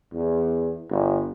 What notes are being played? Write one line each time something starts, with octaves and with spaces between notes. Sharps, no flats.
E2
G1